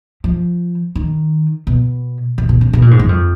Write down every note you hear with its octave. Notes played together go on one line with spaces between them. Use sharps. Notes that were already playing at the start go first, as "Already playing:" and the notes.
F3
D#3
B2
A#2
B2
C#3
B2
A#2
G#2
F#2
F2